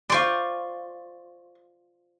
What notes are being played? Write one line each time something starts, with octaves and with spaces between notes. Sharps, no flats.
F4 C5 D5 C6 C#6